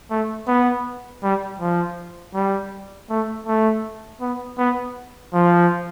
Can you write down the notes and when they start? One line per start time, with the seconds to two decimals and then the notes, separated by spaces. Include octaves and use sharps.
0.11 A3
0.48 B3
1.23 G3
1.60 F3
2.34 G3
3.10 A3
3.47 A3
4.21 B3
4.58 B3
5.34 F3